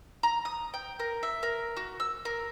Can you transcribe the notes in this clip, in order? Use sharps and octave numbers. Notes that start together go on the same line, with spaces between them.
A#5
D#6
G5
A#4
E5
A#4
F#4
E6
A#4